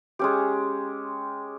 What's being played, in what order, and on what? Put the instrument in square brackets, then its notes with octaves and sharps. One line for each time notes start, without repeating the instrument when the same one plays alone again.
[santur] G#3 C#4 G4